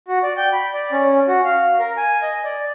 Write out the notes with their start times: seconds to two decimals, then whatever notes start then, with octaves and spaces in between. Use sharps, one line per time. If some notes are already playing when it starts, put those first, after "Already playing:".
0.08 F#4
0.23 D5
0.37 G5
0.53 B5
0.73 D5
0.92 C#4
1.28 F#4
1.45 F5
1.79 A#4
1.97 G#5
2.22 D#5
2.44 D5